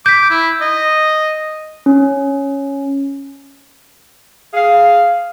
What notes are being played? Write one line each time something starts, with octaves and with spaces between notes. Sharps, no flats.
D6 G6 B6
E4
D#5
C#4
G#4 F5